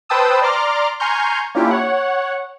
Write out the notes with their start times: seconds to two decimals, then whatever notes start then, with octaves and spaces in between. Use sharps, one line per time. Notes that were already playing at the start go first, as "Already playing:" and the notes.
0.09 B4 C5 G5 A5 D#6 E6
0.42 D5 A#5 C6 D6 F6
1.00 G#5 A#5 C6 C#6 F6 G6
1.55 A#3 C#4 D4 E4 F4 G4
1.71 C#5 F#5